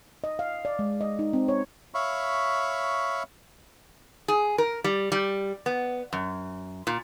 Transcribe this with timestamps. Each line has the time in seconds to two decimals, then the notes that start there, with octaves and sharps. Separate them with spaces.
0.24 D#5
0.39 F5
0.65 D5
0.79 G#3
1.01 D#5
1.19 D#4
1.33 C4
1.48 C#5
1.94 C#5 E5 F5 B5 C#6
4.28 G#4
4.58 A#4
4.84 G3
5.12 G3
5.66 B3
6.13 F#2
6.87 A#2